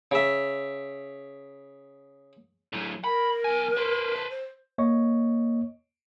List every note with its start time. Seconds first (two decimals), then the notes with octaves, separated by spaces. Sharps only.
0.11 C#3 E5
2.73 A2 F#3
3.04 A#4 B5
3.44 B1 G#5
3.77 B4 C5
4.16 A5
4.30 C5
4.78 A#3 C#5 D#5 C#6